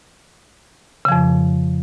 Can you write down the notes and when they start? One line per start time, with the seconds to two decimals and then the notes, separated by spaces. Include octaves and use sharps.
1.05 C#3
1.08 F3
1.12 F2